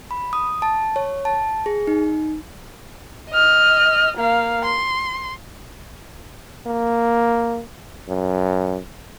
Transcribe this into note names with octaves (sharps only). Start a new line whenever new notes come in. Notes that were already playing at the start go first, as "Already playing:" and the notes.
B5
D#6
A5
C#5
A5
G#4
D#4
D#5 F6
A#3 F5
C6
A#3
F#2